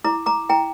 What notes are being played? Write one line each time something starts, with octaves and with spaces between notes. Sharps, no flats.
E4 A#5 D6
A#5 D6
E4 G5 A#5